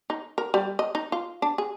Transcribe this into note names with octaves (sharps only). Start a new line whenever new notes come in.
D#4
A#4
G3
D#5
D#4
F4
D4
G#4